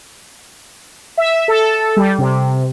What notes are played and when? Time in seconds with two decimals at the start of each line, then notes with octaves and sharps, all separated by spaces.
1.17 E5
1.48 A4
1.97 G3
2.18 C3